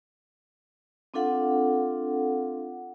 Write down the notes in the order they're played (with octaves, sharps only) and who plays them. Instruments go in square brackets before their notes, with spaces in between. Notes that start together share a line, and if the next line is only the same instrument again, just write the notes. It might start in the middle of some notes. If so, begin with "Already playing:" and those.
[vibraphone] C4 D4 F4 A4 F5 F#5